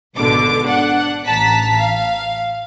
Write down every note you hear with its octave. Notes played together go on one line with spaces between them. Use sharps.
G#1 B2 D3 D6
D4 F#5
A1 A5 A#5 B6
F5